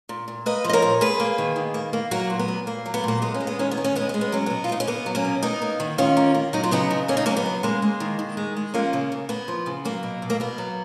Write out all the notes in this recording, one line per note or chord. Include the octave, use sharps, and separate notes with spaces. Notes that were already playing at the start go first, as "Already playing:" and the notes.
A#2
A#2
A#3 B4 D#5
F3 D#5
A#4 C#5
A#2
A#3 G#4 B4
A#3
D#3
D#3
A#3
A#3
F#3 F#4 A#4
A#2
B3
A#2
A#3
F#3
B3
A#2 A#3
G#3 B3
C#4
G#3
B3
D#3 C#4
B3
D#3
C#4
G#3 B3
G#3 C#4
B3
F#3 C#4
B2 B3
F4
B2 D#4
C#4
A#3 B3
F#3
A#3 C#4
B2
A#3 B3 D#4
A#3
D#3
D#3 C#4 F4
A#3
A#3
F#3 D#4
F4
C#3 B3 D#4
C#3
A#3 C#4
D#4
F#3 A#3 C#4
B3
C#3
G#3 A#3
G#3
D#3
D#3
G#3
G#3
F3 A#3 C#4
C#3
C#3
A#3 B3
F3
C#3
F#3 A#3
B2
B2
A#3
A#3 B3
F#3